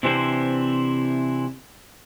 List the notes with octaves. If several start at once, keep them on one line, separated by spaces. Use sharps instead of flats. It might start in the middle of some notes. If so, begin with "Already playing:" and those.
C3 E3 C4 D4 E4 C5